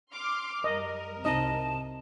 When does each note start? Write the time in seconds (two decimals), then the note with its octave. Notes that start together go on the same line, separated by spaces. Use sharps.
0.12 C6 D6 F6
0.64 F#2 G3 A#4 D#5
1.25 C2 C3 C4 D#4 D#5 A5